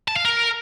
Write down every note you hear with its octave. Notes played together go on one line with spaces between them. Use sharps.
A5
F5
A#4